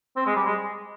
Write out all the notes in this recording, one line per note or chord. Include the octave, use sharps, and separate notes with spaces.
C4
G#3
G3
G#3